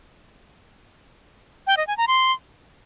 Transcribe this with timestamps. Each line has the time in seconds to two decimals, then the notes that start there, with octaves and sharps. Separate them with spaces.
1.67 G5
1.77 D#5
1.87 G#5
1.97 A#5
2.08 C6